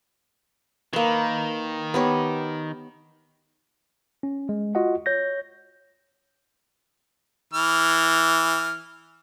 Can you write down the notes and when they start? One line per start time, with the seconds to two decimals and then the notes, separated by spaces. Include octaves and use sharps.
0.93 D#3 A#3 B4
1.94 B3 G4 C#5
4.23 C#4
4.49 G#3
4.75 F4 F#4 D#5 F#5
5.06 C#5 G6 A#6
7.54 E3 F6